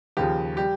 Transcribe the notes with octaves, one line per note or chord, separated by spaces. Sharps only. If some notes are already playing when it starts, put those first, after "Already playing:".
D#2 C#3 F3 G4
G3 G4